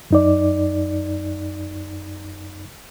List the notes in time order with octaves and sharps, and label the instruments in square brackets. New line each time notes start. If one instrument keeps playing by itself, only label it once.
[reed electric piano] F#2 D#4 D5